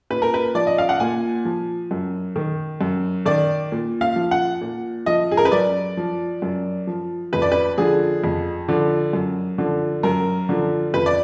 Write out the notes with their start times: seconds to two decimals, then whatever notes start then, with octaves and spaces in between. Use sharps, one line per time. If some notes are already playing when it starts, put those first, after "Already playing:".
0.10 A#2 B4
0.22 A#4
0.34 B4
0.55 F3 D5
0.67 D#5
0.78 F5
0.89 F#5
1.00 A#2 G#5
1.45 F3
1.91 F#2
2.36 D#3
2.81 F#2
3.26 D#3 D5
3.72 A#2
4.01 F5
4.16 F3
4.31 F#5
4.61 A#2
5.06 F3 D#5
5.31 G#4
5.37 A#4
5.45 B4
5.52 F#2 D5
5.97 F3
6.42 F#2
6.87 F3
7.33 F2 B4
7.42 D5
7.52 B4
7.78 D3 F3 G#4
8.24 F2
8.68 D3 F3
9.13 F#2
9.58 D3 F3
10.03 F#2 A#4
10.49 D3 F3
10.94 F2 B4
11.06 D5